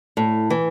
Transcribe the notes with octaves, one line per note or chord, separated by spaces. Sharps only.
A2
E3